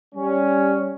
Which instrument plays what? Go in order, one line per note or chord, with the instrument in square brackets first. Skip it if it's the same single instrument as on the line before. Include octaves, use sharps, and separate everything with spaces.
[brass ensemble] G3 C#4